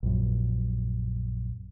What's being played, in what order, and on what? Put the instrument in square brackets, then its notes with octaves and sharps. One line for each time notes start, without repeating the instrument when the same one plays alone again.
[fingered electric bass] A#1 F#2